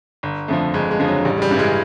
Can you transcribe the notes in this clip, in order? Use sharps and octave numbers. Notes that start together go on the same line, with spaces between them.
G1
F2 D3 F3 A3
G1 G#3
G#3
F2 D3 F3
F#3
A1 G3
G#3
G3
G2 E3
G#3